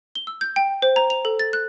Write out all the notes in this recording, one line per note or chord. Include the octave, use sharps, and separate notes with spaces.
G7
E6
G6
G5
C5
A#5
F7
A4
A6
F#6